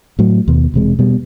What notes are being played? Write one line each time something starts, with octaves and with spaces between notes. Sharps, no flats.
A2 F#3
D#2 B2
E1 C3 G#3
B2 G3